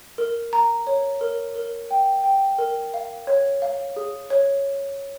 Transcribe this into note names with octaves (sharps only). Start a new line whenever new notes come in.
A#4
A#5
C#5
A#4
A#4
G5
G5
A#4
F5
C#5
F5
G#4
C#5